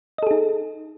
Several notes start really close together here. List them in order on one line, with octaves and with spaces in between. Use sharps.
D#5 A4 G#4 D#4